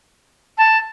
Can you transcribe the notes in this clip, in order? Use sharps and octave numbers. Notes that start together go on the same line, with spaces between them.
A5